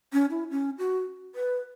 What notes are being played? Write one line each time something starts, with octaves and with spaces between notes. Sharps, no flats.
C#4
E4
C#4
F#4
B4